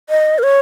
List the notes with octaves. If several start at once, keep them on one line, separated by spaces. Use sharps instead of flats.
D#5
A#4
C#5